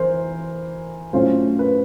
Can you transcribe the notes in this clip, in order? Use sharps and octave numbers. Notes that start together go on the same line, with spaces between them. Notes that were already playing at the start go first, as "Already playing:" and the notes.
Already playing: E3 A#4 C5
A2 F#3 A3 C#4 F4 C5
B4